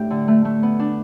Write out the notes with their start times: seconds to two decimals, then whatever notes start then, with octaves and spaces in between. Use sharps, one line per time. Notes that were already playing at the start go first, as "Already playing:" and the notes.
Already playing: A2 A3 D4 G4
0.10 D3
0.28 A3
0.45 A3
0.63 B3
0.79 D4